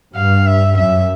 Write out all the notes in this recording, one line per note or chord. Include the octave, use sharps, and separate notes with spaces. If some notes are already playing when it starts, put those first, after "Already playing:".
G2 F5
E5
F#2 E5